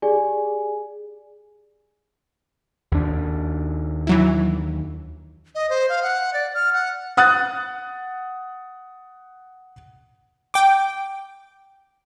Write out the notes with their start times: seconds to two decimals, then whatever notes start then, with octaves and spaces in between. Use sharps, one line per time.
0.02 G4 G#4 D5 G#5
2.92 D#2 D4
4.07 E3 F#3 E4
5.55 D#5
5.70 C5
5.89 F5
6.03 F#5
6.34 D5
6.55 F6
6.73 F#5
7.17 F#5 D#6 F#6 A6
10.54 G5 D6